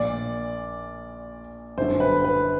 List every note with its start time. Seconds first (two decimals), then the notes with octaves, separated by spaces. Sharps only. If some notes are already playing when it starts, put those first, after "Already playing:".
Already playing: A#1 A#2 D5
1.78 G1 F#2 D3 C5
2.00 B4
2.24 B4